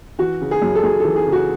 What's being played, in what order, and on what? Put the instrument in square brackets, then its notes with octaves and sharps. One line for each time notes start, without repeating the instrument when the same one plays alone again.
[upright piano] E3 F#4
C#3
G#4
F#2
A4
F#2 G#4
E3 A4
G#4
C#3
F#4